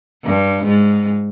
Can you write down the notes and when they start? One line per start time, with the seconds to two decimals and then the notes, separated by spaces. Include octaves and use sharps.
0.24 G2
0.64 G#2